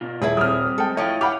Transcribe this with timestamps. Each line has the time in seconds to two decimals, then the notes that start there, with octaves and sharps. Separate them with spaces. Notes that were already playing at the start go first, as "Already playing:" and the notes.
0.01 B2 F4
0.22 D#1 E4 G#4 B4
0.37 G3 C4 D#6 F6
0.78 G#3 A4 G5
0.97 A2 F3 E4 C#5 D#5 G5
1.21 G4 F5 F#5 B5 D6